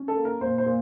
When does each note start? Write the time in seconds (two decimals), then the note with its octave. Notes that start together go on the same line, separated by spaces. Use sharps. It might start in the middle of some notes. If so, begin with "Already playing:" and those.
Already playing: C#4
0.08 A4
0.16 A#3
0.25 A#4
0.41 A#2 C5
0.58 C5
0.66 A#2